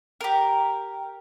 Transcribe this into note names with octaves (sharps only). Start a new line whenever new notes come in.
G4 A#4